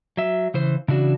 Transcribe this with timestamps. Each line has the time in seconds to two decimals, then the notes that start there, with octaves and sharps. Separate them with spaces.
0.17 F#3 E5
0.54 C#3 E3 C5
0.88 C#3 E3 D4 F#4